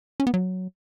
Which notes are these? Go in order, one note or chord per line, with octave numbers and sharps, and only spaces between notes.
C#4
B3
F#3